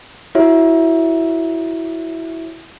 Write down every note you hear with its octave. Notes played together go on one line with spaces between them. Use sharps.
E4 F#4 C#5 E5